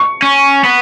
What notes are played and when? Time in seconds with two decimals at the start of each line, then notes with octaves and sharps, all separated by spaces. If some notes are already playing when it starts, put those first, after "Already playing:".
Already playing: C#6
0.22 C#4
0.64 B3